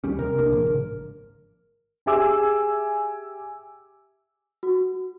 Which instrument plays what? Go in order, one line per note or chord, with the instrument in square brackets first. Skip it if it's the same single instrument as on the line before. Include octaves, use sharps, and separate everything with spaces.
[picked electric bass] D#2 G3 C#4
[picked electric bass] C3 [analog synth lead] A#4
[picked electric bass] C2 A#3 D4
A2 C#3 F3
G#1
[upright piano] G4 G#4 E5 G#5 D6 E6
[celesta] F#4